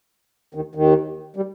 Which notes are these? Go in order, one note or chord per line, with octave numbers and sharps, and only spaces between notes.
D#2 D#3
D#2 D#3
G3